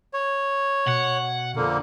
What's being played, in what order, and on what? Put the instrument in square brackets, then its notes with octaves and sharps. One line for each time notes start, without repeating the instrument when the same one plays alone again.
[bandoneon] C#5
[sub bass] B2 [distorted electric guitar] F#5
[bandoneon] F2 D3 A#3